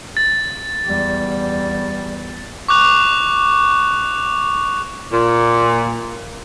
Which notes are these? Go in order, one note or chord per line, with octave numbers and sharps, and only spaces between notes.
A6
E2 G3
C#6 D6 F#6 F7
A#2